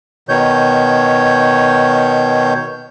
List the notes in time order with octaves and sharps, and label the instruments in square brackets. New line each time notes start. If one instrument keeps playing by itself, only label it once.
[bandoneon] B2 D#3 C#5 G6